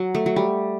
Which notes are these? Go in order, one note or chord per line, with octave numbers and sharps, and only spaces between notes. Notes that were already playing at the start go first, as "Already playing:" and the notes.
Already playing: F#3
A3
F#3
G3